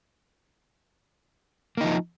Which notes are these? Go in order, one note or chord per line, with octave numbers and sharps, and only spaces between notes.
F3 A#3 D#4